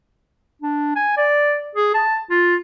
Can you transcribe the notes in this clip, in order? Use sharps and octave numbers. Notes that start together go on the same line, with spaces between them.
D4
G#5
D5
G#4
A5
F4